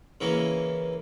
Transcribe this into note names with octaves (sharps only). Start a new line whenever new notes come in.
C#3 E3 A#3